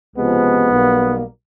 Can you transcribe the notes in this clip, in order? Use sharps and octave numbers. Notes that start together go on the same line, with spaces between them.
C#2 C3 F3 G#3 B3
B1 B2 G3 A#3